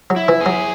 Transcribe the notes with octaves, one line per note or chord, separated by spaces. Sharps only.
F#3
E4
E3
G#4
F#3